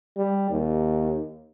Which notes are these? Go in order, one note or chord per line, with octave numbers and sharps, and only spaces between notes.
G3
D#2